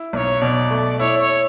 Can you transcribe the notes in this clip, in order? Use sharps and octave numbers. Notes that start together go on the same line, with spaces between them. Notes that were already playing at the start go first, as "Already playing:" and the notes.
Already playing: E4
B1 C#5 D5
B2 D5
A3
E4 C#5
C#5